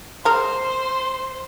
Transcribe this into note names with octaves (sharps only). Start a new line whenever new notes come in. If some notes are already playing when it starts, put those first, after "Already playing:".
G#3 A#4 C5 C6